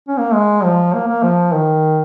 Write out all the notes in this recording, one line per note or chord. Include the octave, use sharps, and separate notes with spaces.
C#4
A#3
G#3
F3
A#3
A#3
F3
D#3